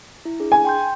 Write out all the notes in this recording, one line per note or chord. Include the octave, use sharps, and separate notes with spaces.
E4
D4 G#4
G#5
G5 C6 G6